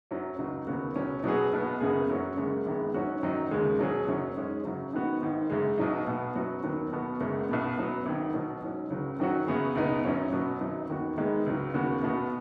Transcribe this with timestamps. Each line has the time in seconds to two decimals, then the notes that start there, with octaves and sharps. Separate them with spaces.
0.11 F#2 F#3 C#4
0.38 C#2 C#3 F#3 D#4
0.67 D#2 C#3 F#3 B3 F#4
0.96 C#2 B2 F#3 C#4
1.24 B2 F#3 B3 G#4
1.53 B1 B2 B3
1.80 F#1 F#2 C#3 B3 G#4
2.09 F#2 F#3 C#4 F#4
2.37 F#1 F#2 C#3 G#3
2.66 G#1 F#2 D#3 G#3 B3
2.94 G#2 F#3 C#4 F#4
3.23 F#2 D#3 F#3 D#4
3.51 D#2 C#3 G#3
3.79 B2 F#3 C#4 G#4
4.07 F#1 F#2 F#3 C#4
4.36 G#2 G#3 C#4 G#4
4.65 F#2 C#3 F#3
4.93 G#2 D#3 B3 F#4
5.22 G#1 G#2 D#3
5.50 F#2 C#3 G#3
5.78 B1 B2 F#3 D#4
6.07 B1 B2 B3
6.35 F#2 F#3 B3 F#4
6.63 D#2 D#3 F#3 B3
6.92 B1 B2 B3 F#4
7.20 F#1 F#2 C#3 G#3
7.49 B1 B2 B3
7.77 F#2 F#3 B3
8.06 G#1 G#2 D#3
8.34 B1 B2 F#3
8.62 G#2 F#3 C#4
8.90 C#2 C#3 F#3
9.19 F#2 D#3 F#3 C#4 F#4
9.47 F#2 C#3 B3 G#4
9.75 C#2 B2 B3 D#4
10.05 G#1 F#2 F#3 C#4
10.32 B2 F#3 B3
10.60 G#1 F#2 F#3 D#4
10.89 D#2 D#3 B3 F#4
11.18 G#2 D#3 G#3 B3 D#4
11.46 C#2 C#3 F#3
11.74 D#2 C#3 B3 F#4
12.03 B1 B2 B3 F#4